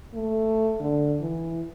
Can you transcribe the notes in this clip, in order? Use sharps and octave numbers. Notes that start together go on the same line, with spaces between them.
A3
D3
E3